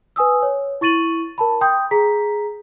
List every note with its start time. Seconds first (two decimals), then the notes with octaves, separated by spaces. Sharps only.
0.16 B4 G#5 D#6 E6
0.42 C#5
0.81 E4 C#6 A6 D#7 F#7
1.38 A#4 A5 B5
1.61 G5 C6 D#6 G6
1.91 G#4 A#5 B6